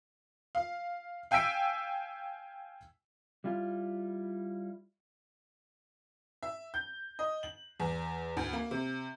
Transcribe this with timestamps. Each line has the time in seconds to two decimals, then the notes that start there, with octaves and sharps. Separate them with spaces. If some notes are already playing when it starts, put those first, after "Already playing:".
0.55 F5
1.31 F5 G5 G#5 E6 B6 D7
3.44 G3 E4 F4
6.43 E5
6.74 G6
7.19 D#5
7.43 F#7
7.80 E2
8.37 D2
8.53 A#3
8.71 C3